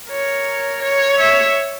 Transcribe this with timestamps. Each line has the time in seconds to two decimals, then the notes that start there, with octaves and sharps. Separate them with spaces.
0.10 A#4 C#5
0.82 C#5
1.17 E5